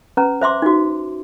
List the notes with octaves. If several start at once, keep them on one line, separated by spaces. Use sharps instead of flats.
C#4 B4 A#5
C5 E5 C6 D6
D#4 F#4